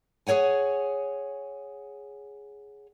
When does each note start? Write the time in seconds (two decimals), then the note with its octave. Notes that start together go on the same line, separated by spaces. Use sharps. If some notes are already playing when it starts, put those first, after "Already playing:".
0.27 G#4 A#4 C#5 F#5 G#5